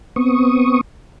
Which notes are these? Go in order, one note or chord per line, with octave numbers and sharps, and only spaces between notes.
B3 C4 C#6 D#6